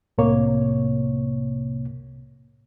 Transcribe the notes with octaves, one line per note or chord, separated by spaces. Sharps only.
C2 A2 C3 A#3 C#5